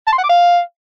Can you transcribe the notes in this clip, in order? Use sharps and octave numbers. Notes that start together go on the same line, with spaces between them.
A5
C6
F#5
D6
F5